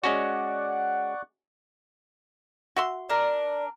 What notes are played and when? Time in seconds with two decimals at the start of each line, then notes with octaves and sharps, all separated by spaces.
0.04 G#3 C#4 F#4 D5 F#5 C#6
2.76 F#4 E5 C6
3.10 D4 A#4 D5